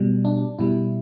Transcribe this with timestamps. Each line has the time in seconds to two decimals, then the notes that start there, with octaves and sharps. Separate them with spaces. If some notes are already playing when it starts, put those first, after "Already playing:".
Already playing: B2 G3
0.25 D4
0.59 B2 G3 E4